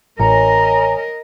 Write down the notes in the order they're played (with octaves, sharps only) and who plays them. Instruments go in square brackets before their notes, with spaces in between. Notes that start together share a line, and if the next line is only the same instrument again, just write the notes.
[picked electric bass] A1 [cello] A#4 D#5 [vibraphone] C#5 G#5 [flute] A#5